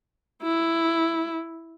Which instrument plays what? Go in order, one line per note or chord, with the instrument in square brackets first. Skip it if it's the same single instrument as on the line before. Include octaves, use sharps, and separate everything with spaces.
[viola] E4